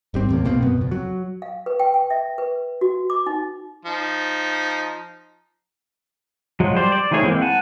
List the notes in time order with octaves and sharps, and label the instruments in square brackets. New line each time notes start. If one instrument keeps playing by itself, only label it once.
[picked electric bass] G#1 G3 C4
E2 A2 C3 A#3
B1 B2 A#3 C4
F#2 B2 B3
F#1 F2
F#3
[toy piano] F5
B4
G5
G5
E5
B4
F#4
D6
D#4
[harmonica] F3 D#4
[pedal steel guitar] F3 F#3 G#3
G3 C5 D5
D5
D#3 F3 A3 G#4 C#5
E3 G#3 A#3 C4
F#5 G#5 A5